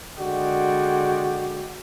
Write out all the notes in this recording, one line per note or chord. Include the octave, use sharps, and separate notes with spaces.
D3 G#3 F#4 D5 G5